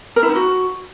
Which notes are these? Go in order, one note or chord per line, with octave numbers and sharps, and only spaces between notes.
A#4
E4
D#4
F#4